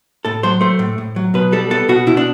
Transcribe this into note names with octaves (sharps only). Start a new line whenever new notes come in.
A2 A4
F#3 C5
A3 C5
A2
A2
F#3
B2 B4
G3 A4
B3 A4
B2 F#4
B2 E4
D4